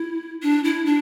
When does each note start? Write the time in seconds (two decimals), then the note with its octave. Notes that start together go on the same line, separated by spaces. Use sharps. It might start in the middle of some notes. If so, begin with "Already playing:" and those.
Already playing: E4
0.42 D4
0.64 E4
0.86 D4